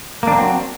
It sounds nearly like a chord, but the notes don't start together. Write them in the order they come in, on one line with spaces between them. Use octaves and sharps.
A#3 D4 C4 F#3